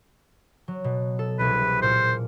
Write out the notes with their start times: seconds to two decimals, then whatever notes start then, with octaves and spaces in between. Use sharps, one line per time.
0.68 F#3
0.84 B2
1.19 A4
1.39 E1 C2 G#4 B4
1.82 A#2 A#4 C5 C#7